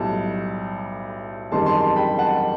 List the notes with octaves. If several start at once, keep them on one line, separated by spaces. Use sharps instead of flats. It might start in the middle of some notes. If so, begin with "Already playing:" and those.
Already playing: B1 A2 G3 A5
F#1 E2 D#3 G3 C4 A5 C6
A5 C6
A5 C6
G5 B5
F#5 A5